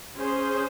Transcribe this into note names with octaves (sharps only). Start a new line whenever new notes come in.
C#4 G#4 C5